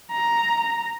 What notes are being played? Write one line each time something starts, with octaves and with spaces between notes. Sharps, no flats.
A#5